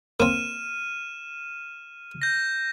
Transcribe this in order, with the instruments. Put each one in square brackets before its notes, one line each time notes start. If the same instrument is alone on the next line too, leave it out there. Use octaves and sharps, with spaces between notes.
[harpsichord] A#3 C4 [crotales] F6 D#7 E7
[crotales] G6 A#6